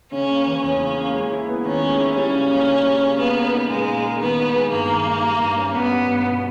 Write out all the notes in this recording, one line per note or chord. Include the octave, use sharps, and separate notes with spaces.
C#3 C#4
A#3
E3
E2 C#4
C#3
A#3
G#3
E4
B3
D#3 C#4
G#3
E4
G3 C#4
C#3
A#3
C#3
G3
C#3
A#3 B3
A#4
D#4
A#2 G#3
A#3
A#4
D#3 B3
D#4
G#3
G2 A#3
D#3
D#4
G3
G2
C#4
G2 B3
G3
G2
B2